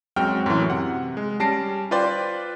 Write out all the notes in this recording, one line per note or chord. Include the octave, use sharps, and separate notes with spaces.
F#2 G#3 C4 F#4 G5 F6
F#2 A2 E3
C3 F#5
G#3
G3 C#4 A5 A#6 C7 D7
F4 B4 C5 D5 G5 C6